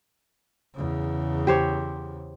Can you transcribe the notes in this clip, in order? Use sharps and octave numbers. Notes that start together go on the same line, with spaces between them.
E2 C#3
G4 C5 C#5